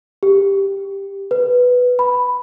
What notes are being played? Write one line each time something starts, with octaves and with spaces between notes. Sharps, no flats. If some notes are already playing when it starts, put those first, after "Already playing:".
G4
B4
B5